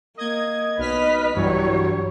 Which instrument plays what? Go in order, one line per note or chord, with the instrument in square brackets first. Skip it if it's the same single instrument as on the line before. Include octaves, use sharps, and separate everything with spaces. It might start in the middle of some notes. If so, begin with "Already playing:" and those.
[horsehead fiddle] A#3 [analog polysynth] D#5 G#6
[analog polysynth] B1 F6 B6 [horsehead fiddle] B4 D#5
[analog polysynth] G2 E3 F#3 [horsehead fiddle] G3 C#5